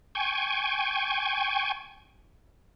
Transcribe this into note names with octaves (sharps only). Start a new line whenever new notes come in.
G5 G#5 C#6